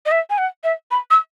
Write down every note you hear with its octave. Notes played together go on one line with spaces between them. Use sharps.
D#5
E5
G#5
F#5
E5
B5
E6